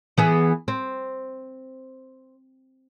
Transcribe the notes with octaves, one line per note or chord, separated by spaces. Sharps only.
E3 B3 G#4
C4